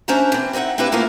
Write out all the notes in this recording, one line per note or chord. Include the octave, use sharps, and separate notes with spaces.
C#4 D4 C5 E5 A5 A#5
E3 C4
C4 D#4 D5 E5 F#5
C4 D4 E4 G4 B4 F5
F3 A3 A#3 D4 E4 F4